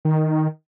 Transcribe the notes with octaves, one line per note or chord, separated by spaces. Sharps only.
D#3